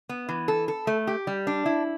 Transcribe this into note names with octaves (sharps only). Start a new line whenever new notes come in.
B3
E3
A4
A4
A3
G4
G3
D4
E4